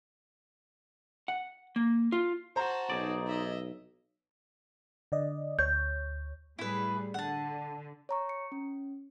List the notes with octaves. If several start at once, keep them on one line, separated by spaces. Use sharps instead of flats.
F#5
A#3
F4
F#4 C5 A5 A#5
B1 D#4 G#4 D5
D#5 E5
D3 D5 D#5
D2 C#5 G6
A2 G3 E4 G#4 B4
D3 F#5 A5
C#5 A#5 C#6
C#7
C#4